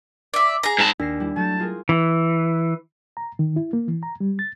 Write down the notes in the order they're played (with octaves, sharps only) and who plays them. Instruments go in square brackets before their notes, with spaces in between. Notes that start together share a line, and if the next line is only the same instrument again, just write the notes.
[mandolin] D5 E5
G#4 A#5
[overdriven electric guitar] G#2 A5
[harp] D#2 A#6 C7 [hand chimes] D4
[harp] G3 E4
[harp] F#3 A3 G6 [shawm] A5
[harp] F4 G#4 A#4
[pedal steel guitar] E3
[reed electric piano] A#5
D#3
E4
A#3
E3
A#5
G3
A6